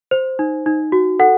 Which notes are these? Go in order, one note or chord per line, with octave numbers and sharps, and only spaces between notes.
C5
D#4
D#4
F#4
A4 F#5